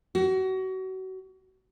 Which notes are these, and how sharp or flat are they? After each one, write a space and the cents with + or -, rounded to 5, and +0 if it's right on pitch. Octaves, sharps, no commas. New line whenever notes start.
F#4 +30